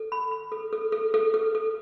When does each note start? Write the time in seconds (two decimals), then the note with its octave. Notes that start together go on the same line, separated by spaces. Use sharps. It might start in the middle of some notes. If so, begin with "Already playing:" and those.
Already playing: A4
0.12 B5
0.31 B5
0.52 A4
0.73 A4
0.92 A4
1.14 A4
1.34 A4
1.55 A4